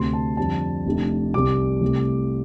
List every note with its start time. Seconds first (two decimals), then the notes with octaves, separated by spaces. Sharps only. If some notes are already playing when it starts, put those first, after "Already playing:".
Already playing: D2 C3 A3 C4 C6
0.13 A5
0.37 F2 D3 G3 C4 A5
0.86 F1 F2 C3 A3 D4
1.34 C2 C3 G3 D6
1.81 C2 C3 A3